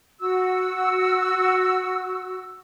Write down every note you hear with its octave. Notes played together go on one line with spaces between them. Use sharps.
F#4 E6